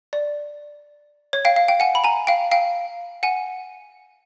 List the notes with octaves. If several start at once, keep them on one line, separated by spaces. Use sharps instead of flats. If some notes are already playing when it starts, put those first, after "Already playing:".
D5
C#5
F5 G5
F5
F5 G5
F#5 G#5
B5
G#5 A#5
F5 G5
F5 G5
F#5 G#5